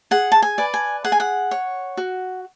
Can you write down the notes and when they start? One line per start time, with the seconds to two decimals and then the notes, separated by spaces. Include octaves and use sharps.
0.11 G#4 F#5
0.32 A5
0.42 G#5
0.58 B4 D5
0.74 G#5
1.05 G#4 F#5
1.12 G#5
1.20 F#5
1.51 C#5
1.97 F#4